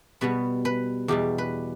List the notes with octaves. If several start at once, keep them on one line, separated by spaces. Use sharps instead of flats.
B2 G3 B3 B4
B4
E2 B2 G3 G4
B4